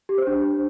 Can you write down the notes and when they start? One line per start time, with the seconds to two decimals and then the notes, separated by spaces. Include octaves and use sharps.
0.09 G4
0.18 C5
0.27 D4